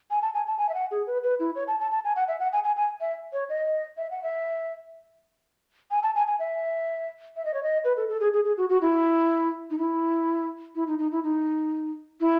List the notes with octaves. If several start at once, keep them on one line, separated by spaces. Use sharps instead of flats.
G#5
A5
G#5
A5
G#5
E5
F#5
G#4
B4
B4
E4
C#5
A5
A5
A5
G#5
F#5
E5
F#5
G#5
G#5
G#5
E5
C#5
D#5
E5
F#5
E5
G#5
A5
G#5
G#5
E5
E5
D#5
C#5
D#5
B4
A4
A4
G#4
G#4
G#4
F#4
F#4
E4
D#4
E4
E4
D#4
D#4
E4
D#4
E4